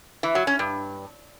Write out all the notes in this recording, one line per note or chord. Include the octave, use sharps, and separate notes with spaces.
E3
F#3
C#4
G2